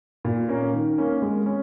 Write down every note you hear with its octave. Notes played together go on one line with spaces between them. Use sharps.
A#2
A#3 C#4 A#4
D#3
A#3 C#4
G#3
C#4